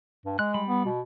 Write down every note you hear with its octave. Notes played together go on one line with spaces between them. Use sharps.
G2
G#3 F#6
G3 B5
B3
B2